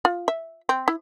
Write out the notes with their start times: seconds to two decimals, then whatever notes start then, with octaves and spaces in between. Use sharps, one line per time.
0.05 F4
0.28 E5
0.69 C4
0.88 E4